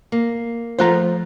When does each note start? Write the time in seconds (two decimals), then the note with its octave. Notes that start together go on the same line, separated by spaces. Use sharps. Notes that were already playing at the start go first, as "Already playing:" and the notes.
0.12 A#3
0.79 F3 A3 F4 C5 F#5 A#5